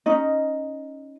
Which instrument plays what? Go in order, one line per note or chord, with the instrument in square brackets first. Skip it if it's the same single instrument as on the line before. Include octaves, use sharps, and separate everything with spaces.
[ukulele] C#4 D#4 D#5